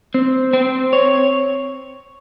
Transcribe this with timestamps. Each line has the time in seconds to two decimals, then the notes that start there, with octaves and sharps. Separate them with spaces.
0.14 C4
0.53 C4
0.93 C#5